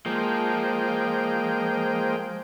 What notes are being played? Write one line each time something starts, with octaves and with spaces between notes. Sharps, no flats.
F3 G#3 A#3 G5